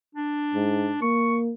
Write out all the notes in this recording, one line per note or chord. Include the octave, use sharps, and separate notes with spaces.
D4
G#2
A#3 C#6